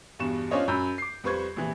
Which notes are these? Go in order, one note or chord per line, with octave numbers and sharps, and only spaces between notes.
E2 G2 B2 C#6 E7
C#4 D4 F4 C5 C#5 D#5
F#2 A#5 B5 E6 G6
D6 C7
F2 G3 B4 C5 C#6 G#6
A#1 C3 E3